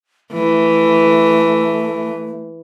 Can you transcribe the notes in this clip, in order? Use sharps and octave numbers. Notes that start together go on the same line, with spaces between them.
E3 A3